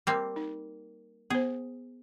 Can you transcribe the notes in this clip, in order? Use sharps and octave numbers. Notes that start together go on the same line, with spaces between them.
G3 A#3 C4
D#4
B3 G#4 C5